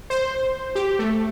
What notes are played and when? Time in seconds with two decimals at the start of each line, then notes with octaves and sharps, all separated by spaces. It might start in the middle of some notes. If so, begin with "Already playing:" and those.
0.10 C5
0.75 G4
0.99 A3